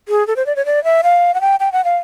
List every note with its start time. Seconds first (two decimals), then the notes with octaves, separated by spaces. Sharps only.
0.09 G#4
0.27 A4
0.36 C5
0.46 D5
0.56 C#5
0.66 D5
0.84 E5
1.03 F5
1.34 F#5
1.41 G5
1.60 G5
1.72 F#5
1.84 F5